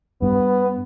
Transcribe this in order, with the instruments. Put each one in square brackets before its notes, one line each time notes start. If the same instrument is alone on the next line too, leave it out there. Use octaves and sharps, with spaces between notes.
[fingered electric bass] G2 [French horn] B3